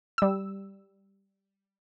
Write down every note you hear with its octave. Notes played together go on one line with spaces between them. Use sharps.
G3 E6